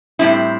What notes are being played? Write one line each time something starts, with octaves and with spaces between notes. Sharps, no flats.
A2 G3 C4 E4